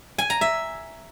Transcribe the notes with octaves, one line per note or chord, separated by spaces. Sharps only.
G#5
A#5
E5